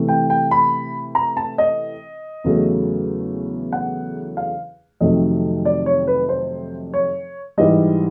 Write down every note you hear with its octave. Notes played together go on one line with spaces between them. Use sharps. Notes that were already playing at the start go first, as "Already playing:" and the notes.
Already playing: C3 E3 A3
G5
G5
B5
A#5
A5
D#5
E2 C#3 F#3 A3
F#5
F5
F2 C3 D#3 F#3 A3 D#5
D5
C#5
B4
C5
C#5
G#2 E3 G3 D#5